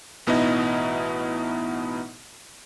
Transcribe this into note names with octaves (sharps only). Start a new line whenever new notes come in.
A1 B2 B3 D#4 E4 D#5